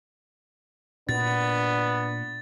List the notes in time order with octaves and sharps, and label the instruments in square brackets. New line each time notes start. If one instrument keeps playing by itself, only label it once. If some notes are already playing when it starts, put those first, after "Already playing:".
[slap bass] A#2 [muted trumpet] B3 [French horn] D4 [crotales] A6